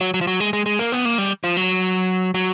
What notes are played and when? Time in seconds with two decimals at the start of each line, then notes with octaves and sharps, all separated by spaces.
0.01 F#3
0.14 F#3
0.21 F3
0.27 F#3
0.40 G#3
0.53 G#3
0.66 G#3
0.79 A#3
0.92 B3
1.05 A#3
1.18 G3
1.44 F3
1.57 F#3
2.34 F#3